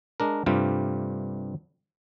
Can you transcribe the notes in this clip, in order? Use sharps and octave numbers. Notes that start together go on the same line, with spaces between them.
G#3 D4 A#4
G2 C3 G3 A3 F4